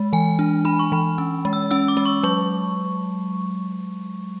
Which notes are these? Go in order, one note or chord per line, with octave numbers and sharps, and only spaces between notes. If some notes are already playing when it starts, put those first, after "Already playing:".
Already playing: G#3
E3 G#5
D4
D4 B5
C#6
E3 B5
C#4
G#3
E6
C#4 E6
D6
G#3
C#6
F#3 C#6